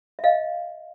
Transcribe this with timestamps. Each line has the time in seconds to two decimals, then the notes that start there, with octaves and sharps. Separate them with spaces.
0.19 E5
0.24 D#5 F5